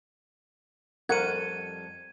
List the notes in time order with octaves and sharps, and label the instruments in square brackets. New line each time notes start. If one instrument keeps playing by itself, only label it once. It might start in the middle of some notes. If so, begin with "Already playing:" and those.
[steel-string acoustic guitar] F2 G3 A4 [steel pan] A#4 F#5 [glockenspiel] G#6 D#7